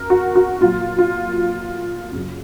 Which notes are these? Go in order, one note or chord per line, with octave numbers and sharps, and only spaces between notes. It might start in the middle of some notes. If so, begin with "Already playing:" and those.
Already playing: F#2 A#4
F#4
F#4
A#2 F#3 F4
F4
F#2 C#3 F#3